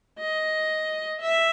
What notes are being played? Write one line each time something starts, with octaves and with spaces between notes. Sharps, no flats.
D#5
E5